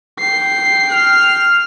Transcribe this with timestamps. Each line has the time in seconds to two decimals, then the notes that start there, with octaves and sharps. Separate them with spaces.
0.19 G5 C7
0.91 F6